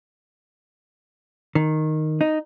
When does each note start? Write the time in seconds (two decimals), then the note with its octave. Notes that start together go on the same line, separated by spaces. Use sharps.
1.55 D#3
2.21 D#4